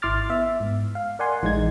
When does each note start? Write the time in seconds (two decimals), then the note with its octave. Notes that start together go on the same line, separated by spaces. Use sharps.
0.02 G#1 E4 C6 D6 F6 A6
0.30 B3 E5
0.60 G#2
0.95 F5
1.19 A#4 D5 F#5 G#5 C6
1.42 A#1 E3 G#3 D#4 G#6